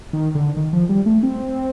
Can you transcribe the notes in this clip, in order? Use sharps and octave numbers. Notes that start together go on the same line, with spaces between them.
D#3
D3
D#3
F3
G3
A3
C4